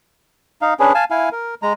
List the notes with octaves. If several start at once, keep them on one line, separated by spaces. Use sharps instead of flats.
D#4 F5
C#4 D4 G#4 B4
F5 G#5 A5
E4 F5 G#5
A#4
G#3 A#5